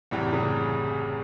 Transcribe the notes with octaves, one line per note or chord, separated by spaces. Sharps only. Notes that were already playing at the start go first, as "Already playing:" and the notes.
F#1 E2 A2 C3 E3 G3
C#3